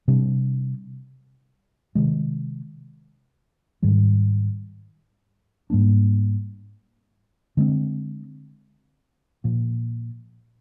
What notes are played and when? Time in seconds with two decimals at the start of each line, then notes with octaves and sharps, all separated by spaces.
0.08 C3 G3 D4
1.95 C3 D#3 G#3
3.83 G#2 D#3 G3
5.70 G#2 G3 A#3 D4
7.57 D3 G#3 C4
9.44 A#2 F3 A#3